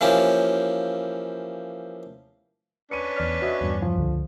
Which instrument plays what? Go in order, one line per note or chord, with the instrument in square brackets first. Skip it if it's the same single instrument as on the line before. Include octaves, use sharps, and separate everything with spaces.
[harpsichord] E3 F3 A#3 C#4 G4
[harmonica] C#4 D4 B4 [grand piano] C#7 D#7
[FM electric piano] E2 D5 F6
[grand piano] F#4 [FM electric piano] C#5 D#5 E5
[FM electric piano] E2 G2
[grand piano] F3
[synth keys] C#2 D3